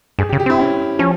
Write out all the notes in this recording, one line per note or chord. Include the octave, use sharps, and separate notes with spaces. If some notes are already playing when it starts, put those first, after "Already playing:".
G2 G#4
G4
C#3
G4
C4 E4
C#4
F3 C#4